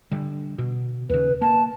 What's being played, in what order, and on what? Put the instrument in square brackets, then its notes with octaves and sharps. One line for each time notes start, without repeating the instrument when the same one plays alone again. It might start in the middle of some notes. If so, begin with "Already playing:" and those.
[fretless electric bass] D3 G3
B2
[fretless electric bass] D#2 C#3 [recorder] B4
[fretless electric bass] A#3 [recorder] A5